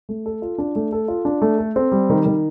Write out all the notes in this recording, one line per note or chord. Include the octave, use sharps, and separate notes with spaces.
A3
A4
F4
D4
A3
A4
F4
D4
A3
A4
C4
G3
D#3
D#3